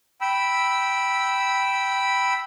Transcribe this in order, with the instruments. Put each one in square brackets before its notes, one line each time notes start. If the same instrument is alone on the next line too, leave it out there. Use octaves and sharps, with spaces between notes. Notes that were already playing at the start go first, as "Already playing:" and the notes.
[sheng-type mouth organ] G5 B5 E6